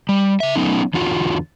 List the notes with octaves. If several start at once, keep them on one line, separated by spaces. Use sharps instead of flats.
G3
C#3 E5
F#3 A3 B3 C#4 D#4
E2 D3 F4 F#4